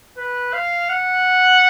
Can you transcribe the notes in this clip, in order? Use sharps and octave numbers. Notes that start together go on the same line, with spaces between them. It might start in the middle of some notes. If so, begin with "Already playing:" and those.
B4
F5
F#5